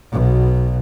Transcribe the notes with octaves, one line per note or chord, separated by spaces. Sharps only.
B1 B2